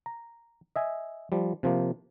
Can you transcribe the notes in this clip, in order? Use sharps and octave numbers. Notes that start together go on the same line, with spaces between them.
A#5
D#5 E5 G#5
F3 G3
C3 F3 A#3